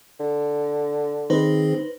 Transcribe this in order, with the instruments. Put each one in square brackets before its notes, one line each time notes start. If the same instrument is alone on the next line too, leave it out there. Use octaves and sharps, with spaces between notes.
[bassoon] D3
[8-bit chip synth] D#3 C4 G#4 [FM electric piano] D#4 B4 C5